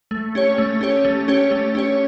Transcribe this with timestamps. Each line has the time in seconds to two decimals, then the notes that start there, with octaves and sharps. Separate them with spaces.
0.11 A3
0.35 C#4 G4 C#5
0.58 A3
0.81 C#4 G4 C#5
1.05 A3
1.28 C#4 G4 C#5
1.51 A3
1.75 C#4 G4 C#5